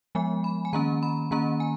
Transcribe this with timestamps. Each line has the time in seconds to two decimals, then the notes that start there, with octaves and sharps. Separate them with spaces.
0.15 F3 G#3 B3 G#5
0.44 B5
0.65 G#5
0.73 D#3 A#3 C#4 A#5
1.03 B5
1.31 D#3 A#3 C#4 A#5
1.60 G#5